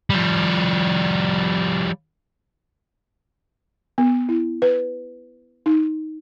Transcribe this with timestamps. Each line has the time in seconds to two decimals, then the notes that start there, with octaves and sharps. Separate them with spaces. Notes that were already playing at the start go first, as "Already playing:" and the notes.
0.10 F3 G3
3.98 B3
4.29 E4
4.62 B4
5.66 D#4